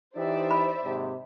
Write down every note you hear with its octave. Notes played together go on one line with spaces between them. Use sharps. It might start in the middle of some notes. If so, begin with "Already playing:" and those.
E3 D#4 G4 C5 D5 E5
B5
D#2 G#2 C3